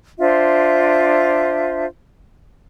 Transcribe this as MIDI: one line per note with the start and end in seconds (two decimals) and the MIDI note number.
0.19 1.85 62
0.19 1.85 65
0.19 1.85 72
0.19 1.85 76